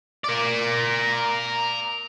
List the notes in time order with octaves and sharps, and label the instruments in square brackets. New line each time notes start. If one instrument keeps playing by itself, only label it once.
[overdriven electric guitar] A#4 D5